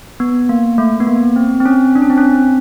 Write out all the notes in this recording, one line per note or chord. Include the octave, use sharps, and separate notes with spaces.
B3
A#3
A3
B3
A#3
C4
C4
C#4
D4
C#4
C4
C#4
C4